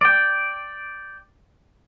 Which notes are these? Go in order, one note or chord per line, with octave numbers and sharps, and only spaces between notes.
D5 G5